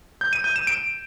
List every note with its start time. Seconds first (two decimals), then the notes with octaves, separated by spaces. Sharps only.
0.21 G6
0.33 D#7
0.44 G6
0.56 E7
0.67 D7